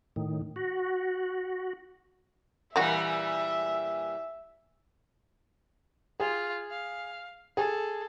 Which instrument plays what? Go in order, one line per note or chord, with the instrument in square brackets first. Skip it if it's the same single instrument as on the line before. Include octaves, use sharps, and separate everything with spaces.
[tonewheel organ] A2 D#3
F#4
[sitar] A#2 E3 G3 [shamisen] A#3 F#4 [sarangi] E5
[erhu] F4 [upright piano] G#4
[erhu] F5
[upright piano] G#4 [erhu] A4